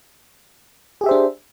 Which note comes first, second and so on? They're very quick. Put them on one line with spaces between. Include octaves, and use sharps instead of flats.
G#4 G4 E5 C5 D4